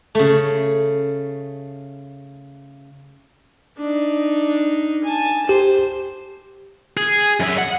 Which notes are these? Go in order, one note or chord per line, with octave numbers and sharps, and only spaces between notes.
C#3 A3
D4 D#4
G#5 A5
G4 C5
G#4
F#2 E5
F#5